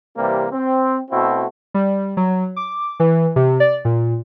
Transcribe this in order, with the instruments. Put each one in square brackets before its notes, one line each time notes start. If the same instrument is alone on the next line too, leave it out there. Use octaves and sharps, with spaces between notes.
[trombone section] C3 E3 G3 A#3 C4
C4
B2 A3 C4 E4 F#4
[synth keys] G3
F#3
D6
E3
C3
D5
A#2